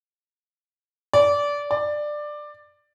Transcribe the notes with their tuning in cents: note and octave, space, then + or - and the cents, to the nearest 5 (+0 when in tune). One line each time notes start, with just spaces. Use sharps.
D5 -20
D5 +15